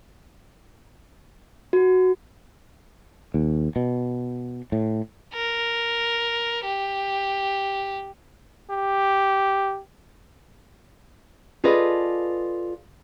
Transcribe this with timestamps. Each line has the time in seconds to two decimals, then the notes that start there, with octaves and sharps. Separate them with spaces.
1.73 F#4
3.34 D#2
3.76 B2
4.72 A2
5.33 A#4
6.65 G4
8.70 G4
11.64 F4 G#4 A4 B4 D5 D#5